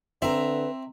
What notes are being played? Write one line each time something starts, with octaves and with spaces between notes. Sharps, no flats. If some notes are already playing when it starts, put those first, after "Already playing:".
D3 C4 B4 E5 A#5